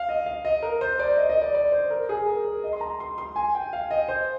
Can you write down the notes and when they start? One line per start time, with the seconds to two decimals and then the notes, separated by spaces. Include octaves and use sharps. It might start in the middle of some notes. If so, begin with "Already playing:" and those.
Already playing: F5
0.09 D#5
0.26 F5
0.45 D#5
0.62 A#4
0.81 C5
0.99 D5
1.17 D#5
1.29 D#5
1.42 D5
1.55 D5
1.72 C5
1.90 A#4
2.09 G#4
2.26 A#4
2.45 A#4
2.64 D#5
2.73 C6
2.81 A#5
3.00 C6
3.18 C6
3.36 G#5
3.55 G5
3.73 F5
3.91 D#5
4.08 C5